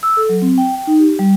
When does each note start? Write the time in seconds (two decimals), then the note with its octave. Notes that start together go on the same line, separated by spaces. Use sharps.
0.03 E6
0.17 A4
0.29 F#3
0.42 C4
0.58 G5
0.75 G5
0.87 D#4
0.99 G4
1.19 G3